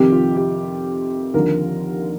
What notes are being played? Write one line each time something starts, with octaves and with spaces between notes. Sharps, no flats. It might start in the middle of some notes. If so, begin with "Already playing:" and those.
Already playing: F2 C3 D#3 G4
F4
G4
D#2 D3 F3 A#4